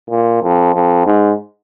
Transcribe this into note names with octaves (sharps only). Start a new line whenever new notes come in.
A#2
F2
F2
G#2